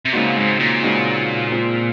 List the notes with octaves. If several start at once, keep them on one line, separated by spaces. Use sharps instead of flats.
C3
A#2 C#3 G#3 C4 D#4 F#4
G#2
A#2
C#3 G#3 C4 D#4 F#4
G#3 C4 F4